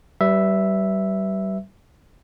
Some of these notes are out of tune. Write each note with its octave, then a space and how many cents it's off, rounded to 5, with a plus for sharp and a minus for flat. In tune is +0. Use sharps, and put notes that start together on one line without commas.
G3 -30 B4 +0 E5 +0